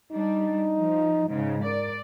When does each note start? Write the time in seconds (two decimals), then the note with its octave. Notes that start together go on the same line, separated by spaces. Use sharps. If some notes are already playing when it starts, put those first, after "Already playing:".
0.12 G3 D4 D#4
0.79 F3
1.29 G#2 C#3 D#4
1.65 A#4 D5